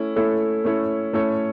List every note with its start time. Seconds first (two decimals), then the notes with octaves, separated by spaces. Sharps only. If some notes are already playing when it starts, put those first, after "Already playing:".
Already playing: A3 C#4 E4 A4
0.16 A3 C#4 E4 A4 C#5
0.64 A3 C#4 E4 A4 C#5
1.13 A3 C#4 E4 A4 C#5